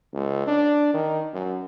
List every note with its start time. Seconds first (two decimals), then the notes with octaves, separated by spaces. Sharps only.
0.13 C#2
0.47 D4
0.94 D#3
1.33 F#2